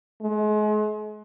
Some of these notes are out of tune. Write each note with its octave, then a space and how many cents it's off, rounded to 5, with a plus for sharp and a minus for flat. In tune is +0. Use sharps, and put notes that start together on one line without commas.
G#3 +35